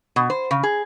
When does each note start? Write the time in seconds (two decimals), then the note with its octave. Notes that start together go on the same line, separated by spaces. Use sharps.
0.16 B2
0.30 C5
0.51 C#3
0.63 G#4